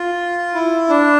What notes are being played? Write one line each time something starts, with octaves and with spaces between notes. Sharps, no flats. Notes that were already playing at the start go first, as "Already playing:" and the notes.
Already playing: F4
E4
D4